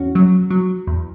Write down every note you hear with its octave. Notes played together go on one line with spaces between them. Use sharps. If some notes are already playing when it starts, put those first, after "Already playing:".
Already playing: E2 C#4 F#4
F#3
F#3
E2